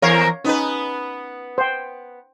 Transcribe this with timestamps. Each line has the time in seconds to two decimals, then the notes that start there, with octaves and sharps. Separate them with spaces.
0.02 E2 A#4 C#5 F5
0.44 B3 C#4 D#4 B4
1.58 C5 G5